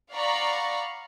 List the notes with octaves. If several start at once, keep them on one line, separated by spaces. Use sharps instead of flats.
D5 F5 F#5 A#5 B5 C#6